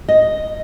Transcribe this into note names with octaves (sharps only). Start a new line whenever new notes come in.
D#5